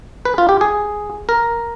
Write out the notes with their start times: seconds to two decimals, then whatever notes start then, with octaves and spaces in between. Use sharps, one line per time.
0.25 B4
0.38 F4
0.49 G4
0.61 G#4
1.29 A#4